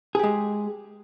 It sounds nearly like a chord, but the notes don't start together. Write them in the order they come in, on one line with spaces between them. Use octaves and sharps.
G#4 G4 G#3